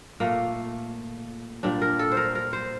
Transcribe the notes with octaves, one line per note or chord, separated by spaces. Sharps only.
A#2 A3 A#3
A#2 G3 D4
A#4
A4
C5
A#4
A#4
C5